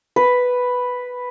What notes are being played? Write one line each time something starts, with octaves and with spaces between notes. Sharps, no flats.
B4